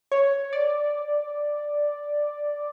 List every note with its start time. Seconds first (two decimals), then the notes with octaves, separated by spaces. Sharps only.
0.12 C#5
0.53 D5